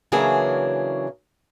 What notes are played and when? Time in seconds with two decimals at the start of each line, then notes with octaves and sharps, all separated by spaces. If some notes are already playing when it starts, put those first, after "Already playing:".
0.12 C#3 E3 F#3 A#3 D4 G#4